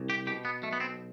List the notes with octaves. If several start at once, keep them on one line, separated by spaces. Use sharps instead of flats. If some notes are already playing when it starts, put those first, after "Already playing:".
Already playing: C2
G4
B2 G4
B3
B1 A3
B3
C4